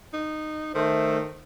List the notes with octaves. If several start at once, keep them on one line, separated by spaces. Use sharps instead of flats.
D#4
D#3 A3 A4 C5